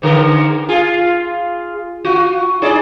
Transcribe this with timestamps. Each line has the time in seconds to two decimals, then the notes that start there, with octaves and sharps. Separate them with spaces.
0.02 G#2 D3 A#4
0.69 F4 G#4
2.05 F4 F#4
2.62 D#4 G#4 D5